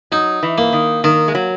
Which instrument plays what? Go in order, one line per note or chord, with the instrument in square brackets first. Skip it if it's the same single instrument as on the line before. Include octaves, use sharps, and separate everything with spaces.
[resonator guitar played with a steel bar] F#3 [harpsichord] D#4
[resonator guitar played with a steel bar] E3
[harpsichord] A#3
[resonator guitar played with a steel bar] D#3
[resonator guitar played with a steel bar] D#3 [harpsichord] A#4
[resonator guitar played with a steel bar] G#3
F#3